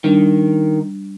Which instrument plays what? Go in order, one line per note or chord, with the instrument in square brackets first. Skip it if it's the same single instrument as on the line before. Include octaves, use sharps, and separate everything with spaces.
[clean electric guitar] D#3 [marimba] G3 D4